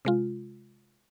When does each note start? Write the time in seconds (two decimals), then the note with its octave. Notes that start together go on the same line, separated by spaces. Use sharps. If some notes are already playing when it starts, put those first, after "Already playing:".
0.05 C3 G#3 F4